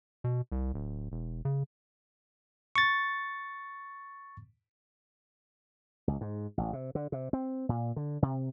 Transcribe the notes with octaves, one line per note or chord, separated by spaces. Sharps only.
B2
C2
D1
E1
C#3
C#6 A6
C#2
G#2
A1
C3
D3
C3
C4
A#2
D3
C3